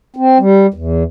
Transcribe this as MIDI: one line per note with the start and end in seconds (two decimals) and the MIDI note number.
0.16 0.38 60
0.39 0.67 55
0.74 1.03 40